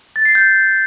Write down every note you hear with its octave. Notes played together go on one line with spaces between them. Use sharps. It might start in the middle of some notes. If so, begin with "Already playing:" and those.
A6
C7
G6